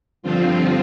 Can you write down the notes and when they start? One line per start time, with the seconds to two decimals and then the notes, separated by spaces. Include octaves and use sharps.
0.23 G2 D3 F3 C4 F4